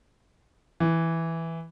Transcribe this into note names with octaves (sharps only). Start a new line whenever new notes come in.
E3